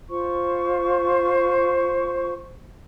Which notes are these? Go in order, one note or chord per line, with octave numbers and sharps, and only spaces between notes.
F4 C5 C#6